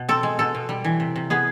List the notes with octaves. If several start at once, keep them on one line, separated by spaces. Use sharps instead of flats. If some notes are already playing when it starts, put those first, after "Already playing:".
Already playing: B2
C4 A4
G#3
B2 A4
B2
G3
E3
C3
C3
B3 G#4